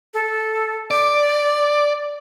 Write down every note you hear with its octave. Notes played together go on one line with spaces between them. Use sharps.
A4
D5 D6